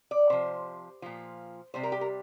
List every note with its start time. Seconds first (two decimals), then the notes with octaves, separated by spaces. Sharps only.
0.11 D5
0.30 C3 F3 C5
1.02 A#2 F3
1.74 C3 G3 C5
1.83 A#4
1.92 G4
2.01 A#4